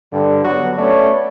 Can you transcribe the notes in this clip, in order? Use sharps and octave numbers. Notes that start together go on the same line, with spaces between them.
G2 D3
F#3 B3 F#4
A3 C#4 A4 B4 C#5 D5